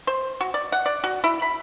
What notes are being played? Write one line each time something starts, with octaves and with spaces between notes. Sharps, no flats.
C5
F#4
D5
F#5
D5
F#4
E4
B5